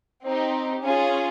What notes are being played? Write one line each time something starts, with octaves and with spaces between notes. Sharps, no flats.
C4 D#4 G4
C#4 F4 G#4